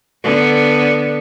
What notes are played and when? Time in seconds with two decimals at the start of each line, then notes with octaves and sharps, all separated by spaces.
0.24 D3 B3